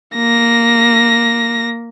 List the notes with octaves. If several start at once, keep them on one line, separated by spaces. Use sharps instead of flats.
A#3 A#6